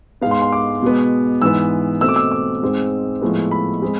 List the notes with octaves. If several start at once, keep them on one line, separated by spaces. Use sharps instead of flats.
G#2 G#3 B3 F5
C6
C6
D6
B2 G#3 B3
G#2 E3 B3 E6
B2 A3 C4 E6
D6
E6
D6
G#2 G#3 C4
A2 F3 G#3 B3
B5
G#3 C4